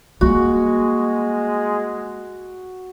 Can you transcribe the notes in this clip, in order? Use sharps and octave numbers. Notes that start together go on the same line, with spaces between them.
G3 G#3 A#3 F#4